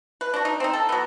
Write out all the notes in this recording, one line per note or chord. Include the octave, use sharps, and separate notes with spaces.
B4
D4 F#4
D#4
C4 D#4
A4
F#3 B3